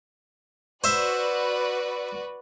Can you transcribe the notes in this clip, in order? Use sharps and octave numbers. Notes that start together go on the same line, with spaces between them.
F#4 B4 C5 D5 E5